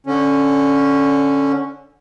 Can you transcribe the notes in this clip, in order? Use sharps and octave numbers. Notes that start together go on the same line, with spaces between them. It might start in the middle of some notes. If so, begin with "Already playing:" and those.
D3 C#4